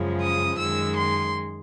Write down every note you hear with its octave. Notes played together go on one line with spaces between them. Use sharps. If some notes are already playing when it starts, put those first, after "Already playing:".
Already playing: F#2 C#3 F3 G#3
D#6
F#2 D#3 G#3 E6
C6